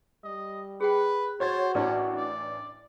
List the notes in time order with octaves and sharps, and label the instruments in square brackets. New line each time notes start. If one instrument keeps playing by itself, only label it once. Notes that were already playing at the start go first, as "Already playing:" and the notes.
[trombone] G3 [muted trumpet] D#5
[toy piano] G#4 G5 [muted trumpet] B4
[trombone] F#4 [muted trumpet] C5 [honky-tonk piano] C#5 G#6 A6
[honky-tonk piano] A1 D4 [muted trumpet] C#4 [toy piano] E4 A#4
[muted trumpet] D5